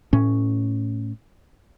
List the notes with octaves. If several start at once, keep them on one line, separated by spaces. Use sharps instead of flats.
A2 C#4